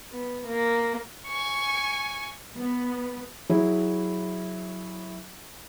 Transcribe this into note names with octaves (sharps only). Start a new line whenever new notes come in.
B3
A#3
G#5 C#6
B3
F#3 E4 G#4